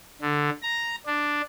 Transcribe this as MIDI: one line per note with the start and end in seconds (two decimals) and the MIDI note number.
0.21 0.50 50
0.63 0.96 82
1.06 1.41 62